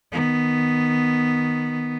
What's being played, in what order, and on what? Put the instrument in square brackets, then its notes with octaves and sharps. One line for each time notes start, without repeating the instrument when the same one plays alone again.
[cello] D#3 B3